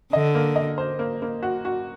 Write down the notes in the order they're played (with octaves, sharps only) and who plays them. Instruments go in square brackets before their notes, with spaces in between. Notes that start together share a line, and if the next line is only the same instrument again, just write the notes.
[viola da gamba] D3 [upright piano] D#5
[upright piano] A#3
D#5
C5
A#3
A#3
F#4
F#4